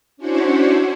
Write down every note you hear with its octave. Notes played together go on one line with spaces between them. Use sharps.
C#4 D4 E4 F#4 C5 C#5